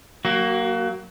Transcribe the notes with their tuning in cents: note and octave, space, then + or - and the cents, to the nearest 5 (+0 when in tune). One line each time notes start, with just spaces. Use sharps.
F#3 +0 A#3 +0 F#4 +30